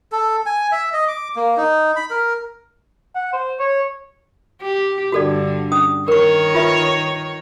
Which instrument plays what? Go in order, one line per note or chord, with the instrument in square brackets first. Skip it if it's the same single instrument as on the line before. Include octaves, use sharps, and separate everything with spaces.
[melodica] A4
G#5
E5
D#5
D6
A#3
D#4
B5
A#4
[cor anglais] F#5
C5
C#5
[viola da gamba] G4
[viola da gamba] G2 D3 [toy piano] F#4 A4 D5
[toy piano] C#4 D#6
[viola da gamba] D#3 C#5 [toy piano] A#4 C#6
[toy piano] F4 B4 E5